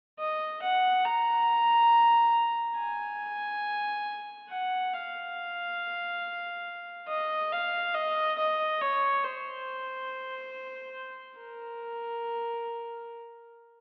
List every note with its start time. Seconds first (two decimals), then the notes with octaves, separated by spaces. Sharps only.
0.19 D#5
0.62 F#5
1.05 A#5
2.78 G#5
4.50 F#5
4.93 F5
7.08 D#5
7.52 F5
7.95 D#5
8.38 D#5
8.81 C#5
9.24 C5
11.39 A#4